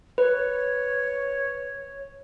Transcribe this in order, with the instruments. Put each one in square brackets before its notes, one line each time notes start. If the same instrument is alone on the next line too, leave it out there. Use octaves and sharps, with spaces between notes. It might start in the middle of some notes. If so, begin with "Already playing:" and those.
[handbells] B4 [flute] C#5